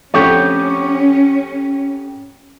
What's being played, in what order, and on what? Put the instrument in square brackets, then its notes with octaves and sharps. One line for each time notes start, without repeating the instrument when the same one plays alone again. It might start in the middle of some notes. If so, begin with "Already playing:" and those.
[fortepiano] F2 D3 A3 [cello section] C#4 [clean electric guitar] G4 C#5